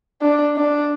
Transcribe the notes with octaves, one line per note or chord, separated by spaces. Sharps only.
D4
D4